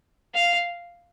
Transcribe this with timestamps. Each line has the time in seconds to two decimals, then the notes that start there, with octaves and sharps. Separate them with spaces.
0.35 F5